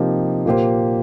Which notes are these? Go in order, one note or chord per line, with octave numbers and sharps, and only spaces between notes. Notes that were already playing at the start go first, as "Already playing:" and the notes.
Already playing: C3 F3 A#3 D#4 G4
A#2 A#3 G4 C5